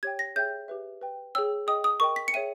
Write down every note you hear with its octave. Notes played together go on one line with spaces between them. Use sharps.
G4 C#5 G5 G#6
A#6
G#4 C#5 E5 G5 G6
G4 B4 E5
B4 G5
G#4 C#5 G5 E6
G#4 D#5 G5 D#6
D#6
A#4 D#5 G5 C#6
B6
C#7
G#4 C#5 E5 G5 D#7